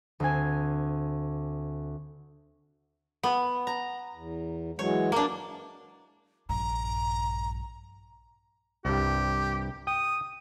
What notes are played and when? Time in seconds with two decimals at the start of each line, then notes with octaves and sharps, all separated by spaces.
0.20 D2 C4 G#5
3.23 B3
3.67 A#5
4.14 E2
4.79 E3 F#3 G#3 C#5
5.12 A#3 D4
6.49 A#1 G2 A#5
8.85 C2 G2 G4
9.87 G5 D#6